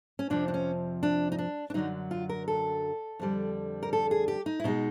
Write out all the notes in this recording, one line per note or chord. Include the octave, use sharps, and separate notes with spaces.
C#4
F2 C3 F3 D4
D4
C#4
D4
D#4
D4
D4
F#2 D3 F#3 D#4
F4
A#4
A4
F2 D3 G3
A#4
A4
G#4
G4
D#4
E4
B2 G#3 D#4